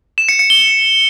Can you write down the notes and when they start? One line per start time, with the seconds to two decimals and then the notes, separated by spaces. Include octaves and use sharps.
0.18 E7
0.29 C#7
0.39 C#7
0.50 G7